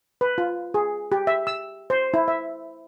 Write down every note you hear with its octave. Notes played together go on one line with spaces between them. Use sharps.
B4
F4
G#4
G4
E5
E6
C5
E4
E5